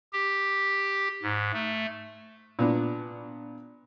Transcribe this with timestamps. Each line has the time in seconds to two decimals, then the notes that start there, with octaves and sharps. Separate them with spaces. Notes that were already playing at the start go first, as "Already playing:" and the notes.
0.13 G4
1.23 G#2
1.54 A3
2.59 A#2 B3 D4